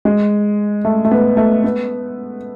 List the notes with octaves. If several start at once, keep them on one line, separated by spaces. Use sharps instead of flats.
G#3
A3
A3
B3
A3
B3